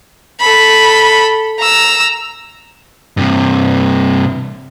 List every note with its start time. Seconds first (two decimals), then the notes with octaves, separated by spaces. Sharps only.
0.40 A4 B5
1.58 A#5 E6
3.17 G2 C3